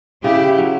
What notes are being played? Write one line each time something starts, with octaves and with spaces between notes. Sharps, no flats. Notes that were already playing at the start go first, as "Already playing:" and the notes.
C#3 E4 G4
F#3